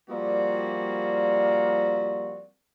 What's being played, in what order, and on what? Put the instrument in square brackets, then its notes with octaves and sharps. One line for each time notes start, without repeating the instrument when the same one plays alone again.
[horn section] F3 G3 A#3 C4 F#4 D5